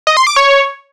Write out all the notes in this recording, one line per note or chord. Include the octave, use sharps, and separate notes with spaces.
D#5
C6
D6
C#5